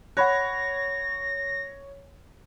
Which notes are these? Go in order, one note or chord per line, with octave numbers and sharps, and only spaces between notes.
C#5 F#5 B5 F#6 A#6